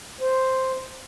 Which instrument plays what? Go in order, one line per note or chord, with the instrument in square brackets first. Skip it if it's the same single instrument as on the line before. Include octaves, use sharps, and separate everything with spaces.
[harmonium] C5